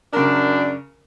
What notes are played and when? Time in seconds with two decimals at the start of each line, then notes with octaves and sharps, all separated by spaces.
0.13 F#2 C#3 D4 A#4